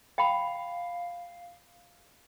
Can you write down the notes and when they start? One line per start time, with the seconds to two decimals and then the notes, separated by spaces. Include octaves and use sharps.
0.18 F5 G5 B5